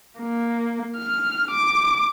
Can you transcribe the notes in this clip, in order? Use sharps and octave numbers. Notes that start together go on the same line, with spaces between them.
A#3
F6
D6